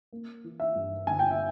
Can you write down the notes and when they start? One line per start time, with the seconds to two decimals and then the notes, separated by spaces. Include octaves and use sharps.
0.12 A#3
0.44 E3
0.60 E5
0.75 G2
1.07 G1 G#5
1.19 G5
1.31 E5